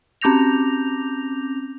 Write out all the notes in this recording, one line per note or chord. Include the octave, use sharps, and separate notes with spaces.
C4 C#4 D6 G6 A#6 F7